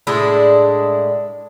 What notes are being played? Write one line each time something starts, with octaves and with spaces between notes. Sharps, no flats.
A2 G#3 D4 E4